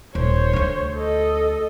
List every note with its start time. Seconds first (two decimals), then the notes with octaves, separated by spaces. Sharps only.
0.15 D#1 C5 C#5
0.53 D2 D3
0.97 A4 D#5